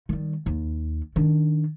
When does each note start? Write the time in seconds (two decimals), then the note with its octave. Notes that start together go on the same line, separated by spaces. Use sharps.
0.09 D#3 G3
0.46 D#2
1.16 D#3 D4